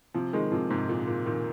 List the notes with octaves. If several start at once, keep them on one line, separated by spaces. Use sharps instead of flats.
C3 F3
D#3 G#3
C3 F3
G#2 C3
A#2
A#2
A#2 D#3